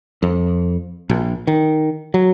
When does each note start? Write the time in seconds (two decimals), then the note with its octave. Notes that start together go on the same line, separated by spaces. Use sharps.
0.22 F2
1.10 A#1
1.47 D#3
2.14 F#3